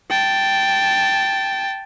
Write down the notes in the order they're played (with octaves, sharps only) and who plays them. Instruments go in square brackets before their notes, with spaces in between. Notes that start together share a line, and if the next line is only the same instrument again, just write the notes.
[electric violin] G5 A5